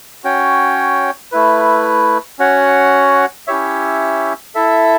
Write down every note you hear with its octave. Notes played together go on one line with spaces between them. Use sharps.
C#4 F#4 C#5 G5
A3 E4 B4
C#4 F#4 C#5 F#5
C#4 E4 G4 C#5 E5
E4 A4 E5